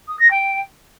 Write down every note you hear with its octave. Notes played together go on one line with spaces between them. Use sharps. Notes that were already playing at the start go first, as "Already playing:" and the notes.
D#6
A#6
G5